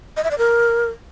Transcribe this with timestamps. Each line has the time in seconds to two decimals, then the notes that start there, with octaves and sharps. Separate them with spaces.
0.17 D#5
0.24 E5
0.31 D5
0.38 A#4